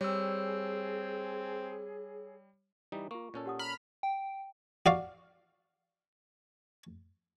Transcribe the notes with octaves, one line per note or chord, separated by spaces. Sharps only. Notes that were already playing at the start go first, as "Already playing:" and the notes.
G3 C4 G#4 C#5 E6
E3 G3 D#4
A#3 F4 C#6
A#2 C#4 A4
G4 F#5 D#6
A#5 B5 F6
G5
F#4 D5 F5